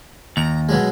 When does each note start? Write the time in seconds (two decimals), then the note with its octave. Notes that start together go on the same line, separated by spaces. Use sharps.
0.37 D#2 A#5
0.69 B2 F#3 G#3